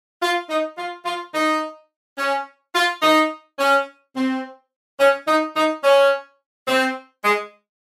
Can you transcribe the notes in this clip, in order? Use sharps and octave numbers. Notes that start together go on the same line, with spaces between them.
F4
D#4
F4
F4
D#4
C#4
F4
D#4
C#4
C4
C#4
D#4
D#4
C#4
C4
G#3